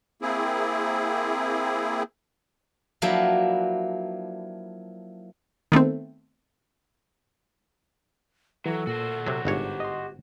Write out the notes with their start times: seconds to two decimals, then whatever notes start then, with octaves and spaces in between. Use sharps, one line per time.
0.22 A#3 C4 E4 G#4
3.02 F3 F#3 A#3 D4 E4 B4
5.72 D#3 A3 B3 C4
8.66 E3 F#3 A4
8.87 A#2 F#4 C5
9.27 C3 F#3
9.45 G1 G#2 G4 C#5
9.80 D#5 C6